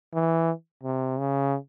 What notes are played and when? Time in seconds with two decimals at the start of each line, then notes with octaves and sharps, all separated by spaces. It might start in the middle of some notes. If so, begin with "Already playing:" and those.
0.14 E3
0.84 C3
1.19 C#3